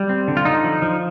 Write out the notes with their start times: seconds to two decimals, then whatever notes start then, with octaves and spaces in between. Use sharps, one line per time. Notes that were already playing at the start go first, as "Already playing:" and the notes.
Already playing: G3
0.09 C4
0.28 D3
0.37 F4
0.45 D3 D#4
0.64 F3
0.82 F3